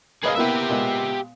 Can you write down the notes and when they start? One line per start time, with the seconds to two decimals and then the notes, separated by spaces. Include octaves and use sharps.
0.24 A#3 G#4 B4 D#5 F5
0.36 A#3 B3 E4 G4 E5
0.69 A#2 G#3 B3